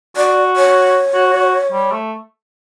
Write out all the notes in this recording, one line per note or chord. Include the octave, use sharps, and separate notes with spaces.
F#4 D5
C#5
F#4
F#4
G3
A3